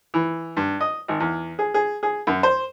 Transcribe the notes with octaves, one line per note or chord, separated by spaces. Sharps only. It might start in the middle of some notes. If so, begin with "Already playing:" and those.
E3
G2
D#5
G#1
E2
G#4
G#4
G#4
F#2
C5